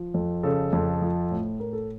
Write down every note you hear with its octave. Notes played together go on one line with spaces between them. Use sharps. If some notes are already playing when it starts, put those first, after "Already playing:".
Already playing: F3
F2
C#3 A4
F2
F3
A2
A2 A#4
A4